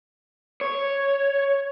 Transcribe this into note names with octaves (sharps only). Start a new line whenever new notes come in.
C#5